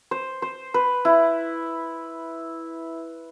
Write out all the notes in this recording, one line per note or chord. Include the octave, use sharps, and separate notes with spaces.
C5
C5
B4
E4